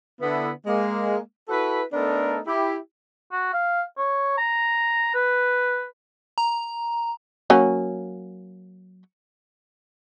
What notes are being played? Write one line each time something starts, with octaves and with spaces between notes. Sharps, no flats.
D3 B3 E4
G#3 A#3
E4 F#4 A4 B4
A3 B3 D4 D#4 A4 A#4
E4 G4
F#4
F5
C#5
A#5
B4
A#5
F#3 A#3 C#4